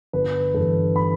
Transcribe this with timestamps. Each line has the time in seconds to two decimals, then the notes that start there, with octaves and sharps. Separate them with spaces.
0.13 G1 B4
0.54 G2 E3 A4
0.96 B5